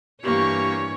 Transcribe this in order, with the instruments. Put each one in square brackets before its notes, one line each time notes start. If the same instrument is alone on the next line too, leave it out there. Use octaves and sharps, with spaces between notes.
[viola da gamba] G2 E3 C#5 [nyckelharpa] A#3 C#6 [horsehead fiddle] G4